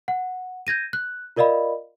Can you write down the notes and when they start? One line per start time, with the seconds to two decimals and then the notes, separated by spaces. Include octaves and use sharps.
0.08 F#5
0.67 G6 G#6 A#6 D#7
0.93 F#6
1.36 F4 A#4 D5 D#5 F5 B5